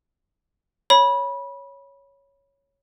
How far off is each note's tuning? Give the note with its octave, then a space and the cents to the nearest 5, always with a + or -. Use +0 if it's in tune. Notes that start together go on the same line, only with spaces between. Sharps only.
C#5 +0 B5 -20